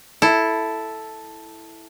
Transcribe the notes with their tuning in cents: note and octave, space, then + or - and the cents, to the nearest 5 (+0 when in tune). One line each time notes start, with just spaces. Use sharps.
E4 +0 A4 +0